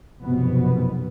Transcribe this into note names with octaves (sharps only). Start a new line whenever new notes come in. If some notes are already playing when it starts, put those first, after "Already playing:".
F1 F#2 B2 B3